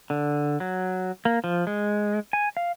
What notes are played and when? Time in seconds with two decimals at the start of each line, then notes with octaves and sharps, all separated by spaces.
0.10 D3
0.60 F#3
1.25 A#3
1.44 F3
1.67 G#3
2.33 G#5
2.57 F5